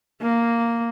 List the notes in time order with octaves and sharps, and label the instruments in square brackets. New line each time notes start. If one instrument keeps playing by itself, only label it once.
[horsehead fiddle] A#3